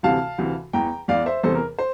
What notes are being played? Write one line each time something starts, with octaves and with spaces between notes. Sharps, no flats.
D2 C3 E3 F5 A5
D2 C3 E3
E2 E3 G5 A#5
E2 E3 D5 F5
C5 E5
E2 C3 E3 A4 C5
A#4
C5